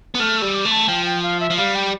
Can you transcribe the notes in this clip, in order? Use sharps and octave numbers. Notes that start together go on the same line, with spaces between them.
B3
A3 F6
G3 E6
D6
A3
A5
F3 G5
G5
F5
E5
F3
G3 F5
G5